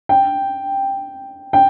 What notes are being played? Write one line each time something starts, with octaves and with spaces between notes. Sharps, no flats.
G5
G5